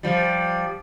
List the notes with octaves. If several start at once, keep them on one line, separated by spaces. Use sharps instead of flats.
F3 G3